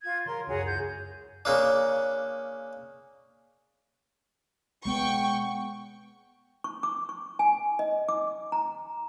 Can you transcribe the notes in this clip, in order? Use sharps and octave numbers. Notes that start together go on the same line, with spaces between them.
F4 G#6
F#3 A#4 C6
C#2 F#2 F#4 G#4 C#5
E4 G6
C#3 A#3 D4
G#3 B3 G5 C#6
C#6
D6
C#6
G#5
D#5
D6
A#5